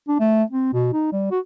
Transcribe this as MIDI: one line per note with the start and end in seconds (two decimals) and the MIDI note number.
0.08 0.18 62
0.20 0.43 57
0.50 0.70 60
0.73 0.90 47
0.93 1.09 63
1.12 1.28 55
1.31 1.39 66